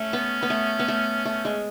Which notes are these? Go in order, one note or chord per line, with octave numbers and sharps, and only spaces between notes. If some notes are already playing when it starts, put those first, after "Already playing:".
Already playing: A3 C#4
B3
B3
A3
B3
A3
A3
G#3